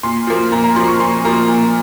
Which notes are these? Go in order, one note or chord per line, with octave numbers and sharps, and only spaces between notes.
A#2 C6
F3 A#3
A#2 A#5
A#5
F3 A#3 C6
C#6
A#2 C6
F3 A#3 A#5
A#2